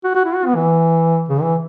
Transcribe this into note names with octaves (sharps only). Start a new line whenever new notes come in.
F#4
F#4
E4
F#4
B3
E3
C#3
E3